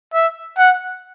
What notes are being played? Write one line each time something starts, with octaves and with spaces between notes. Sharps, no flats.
E5
F#5